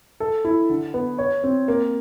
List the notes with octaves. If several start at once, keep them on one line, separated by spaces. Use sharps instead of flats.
A4
E4
D3
B3
C#5
C4
A#3